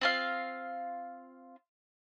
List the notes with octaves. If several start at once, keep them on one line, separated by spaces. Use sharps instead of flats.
C4 F4 F5